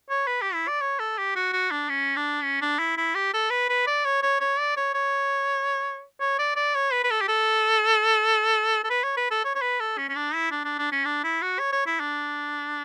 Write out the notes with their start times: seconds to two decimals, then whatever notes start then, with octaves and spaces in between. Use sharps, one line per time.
0.10 C#5
0.27 B4
0.41 G4
0.54 E4
0.68 D5
0.81 C#5
0.99 A4
1.18 G4
1.35 F#4
1.53 F#4
1.71 D4
1.89 C#4
2.17 D4
2.43 C#4
2.62 D4
2.79 E4
2.98 E4
3.15 G4
3.34 A4
3.50 B4
3.69 B4
3.87 D5
4.05 C#5
4.23 C#5
4.41 C#5
4.59 D5
4.77 C#5
4.95 C#5
6.20 C#5
6.39 D5
6.56 D5
6.75 C#5
6.92 B4
7.04 B4
7.11 A4
7.22 G4
7.28 A4
8.84 A4
8.90 B4
9.04 C#5
9.17 B4
9.31 A4
9.44 C#5
9.55 C#5
9.62 B4
9.80 A4
9.98 C#4
10.09 C#4
10.16 D4
10.34 E4
10.51 D4
10.65 D4
10.79 D4
10.92 C#4
11.05 D4
11.24 E4
11.42 F#4
11.59 C#5
11.73 C#5
11.86 E4
12.00 D4